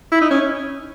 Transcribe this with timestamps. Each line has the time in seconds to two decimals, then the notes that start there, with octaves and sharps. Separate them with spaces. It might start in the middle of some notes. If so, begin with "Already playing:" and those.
0.12 E4
0.21 D#4
0.31 C#4